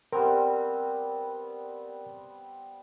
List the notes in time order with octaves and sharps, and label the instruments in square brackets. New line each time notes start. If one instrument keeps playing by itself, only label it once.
[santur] G3 B3 C4 [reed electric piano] A#4